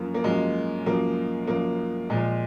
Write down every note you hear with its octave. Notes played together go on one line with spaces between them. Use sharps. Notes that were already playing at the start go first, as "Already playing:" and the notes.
Already playing: F#2 F3 A#3
A#3
F#2 F3 G#3
F#2 F3 A#3
F#2 F3 A#3
A#2 F3 G#3